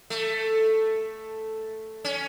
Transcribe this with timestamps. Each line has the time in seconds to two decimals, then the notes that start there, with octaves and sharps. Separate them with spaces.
0.10 A3
2.05 C#4